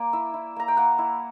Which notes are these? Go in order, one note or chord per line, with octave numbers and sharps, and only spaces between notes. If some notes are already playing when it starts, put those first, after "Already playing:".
Already playing: A#3 D5
E4 E5
E4
A#3 A#5
G5
A#3 F#5
E4